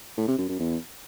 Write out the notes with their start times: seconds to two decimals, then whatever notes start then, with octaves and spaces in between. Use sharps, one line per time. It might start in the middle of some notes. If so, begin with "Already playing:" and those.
0.17 A2
0.28 C3
0.38 F#2
0.49 F#2
0.59 E2